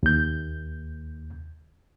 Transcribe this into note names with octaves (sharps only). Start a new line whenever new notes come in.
D#2 G6